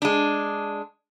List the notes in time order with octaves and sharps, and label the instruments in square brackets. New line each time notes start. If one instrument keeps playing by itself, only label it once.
[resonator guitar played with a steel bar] G#3 D4